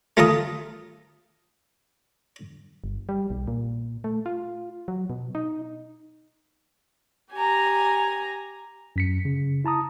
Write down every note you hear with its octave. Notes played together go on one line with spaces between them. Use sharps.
A3 F4 A#4 A5 D#6
G1
G3
B1
A#2
A3
F4
F#3
B2
D#4
G4 G#5 A#5
F#2 B6 C#7
C#3
E4 A5 A#5 D#6